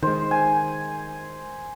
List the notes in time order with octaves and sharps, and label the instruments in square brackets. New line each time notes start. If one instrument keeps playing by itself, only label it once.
[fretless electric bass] D#3 G#3 [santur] C5
[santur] G#5